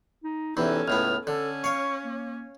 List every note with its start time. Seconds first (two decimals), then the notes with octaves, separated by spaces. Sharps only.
0.24 D#4
0.57 E2 C3 E3 C#4 D#4 A4
0.88 C#2 A2 B3 F6
1.27 D3 C#4 A4
1.64 C#5 F5 C#6
2.05 A#3